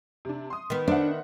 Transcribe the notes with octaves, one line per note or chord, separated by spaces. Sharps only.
C3 D4
C6 D#6
D#3 B3
D4 C5 E5 F#5